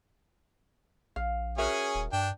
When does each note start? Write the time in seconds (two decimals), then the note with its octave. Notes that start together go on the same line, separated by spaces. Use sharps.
1.16 A#1 F5
1.58 C#4 F#4 G#4 A#4 E5
1.95 D#1
2.13 G2 D4 G5